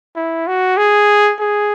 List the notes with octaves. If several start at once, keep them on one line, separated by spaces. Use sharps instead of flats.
E4
F#4
G#4
G#4